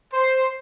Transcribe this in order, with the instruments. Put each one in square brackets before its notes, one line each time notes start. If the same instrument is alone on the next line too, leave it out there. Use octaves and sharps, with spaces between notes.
[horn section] C5